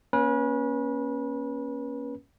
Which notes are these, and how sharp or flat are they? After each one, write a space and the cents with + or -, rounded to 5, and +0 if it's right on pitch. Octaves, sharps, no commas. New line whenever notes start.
A#3 +35 C#4 +0 B4 -35